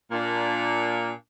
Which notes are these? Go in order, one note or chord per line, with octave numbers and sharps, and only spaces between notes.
A#2 A#3 D4